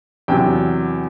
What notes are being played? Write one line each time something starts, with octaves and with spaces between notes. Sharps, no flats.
E2 C3 F#3 G5